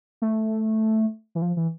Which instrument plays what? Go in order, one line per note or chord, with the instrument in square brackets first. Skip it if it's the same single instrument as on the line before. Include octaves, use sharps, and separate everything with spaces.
[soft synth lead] A3
E3
F3
E3